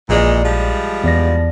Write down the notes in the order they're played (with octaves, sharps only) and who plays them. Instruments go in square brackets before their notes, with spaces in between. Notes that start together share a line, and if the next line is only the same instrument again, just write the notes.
[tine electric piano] A#1 D5 [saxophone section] A#2 E3 G#3
[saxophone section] F3 G3 G#3
[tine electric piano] E2 D5 A#6